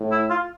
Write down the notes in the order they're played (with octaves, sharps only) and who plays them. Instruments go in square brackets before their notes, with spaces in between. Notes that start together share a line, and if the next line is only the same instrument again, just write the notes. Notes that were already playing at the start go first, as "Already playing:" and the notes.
Already playing: [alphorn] A2
[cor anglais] E4
F4